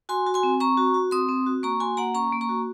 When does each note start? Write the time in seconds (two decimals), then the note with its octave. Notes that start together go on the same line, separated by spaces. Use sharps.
0.09 F#4 G#5 C6
0.26 F#4
0.34 G#5 C6
0.43 C4
0.60 C4 A#5 C#6
0.77 F#4
0.94 F#4
1.11 C4 C6 D#6
1.29 C4
1.46 F#4
1.63 A#3 A#5 C#6
1.80 F#4 G#5 C6
1.97 A#3 F#5 A#5
2.14 C#4 A#5 C#6
2.33 A#3
2.41 A#5 C#6
2.49 F#4